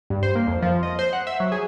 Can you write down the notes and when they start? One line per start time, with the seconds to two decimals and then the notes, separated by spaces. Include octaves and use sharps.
0.10 G2
0.23 C5
0.35 A#3
0.47 F2
0.62 F3
0.83 D#5
0.99 C5
1.13 F#5
1.27 E5
1.40 F#3
1.52 G#4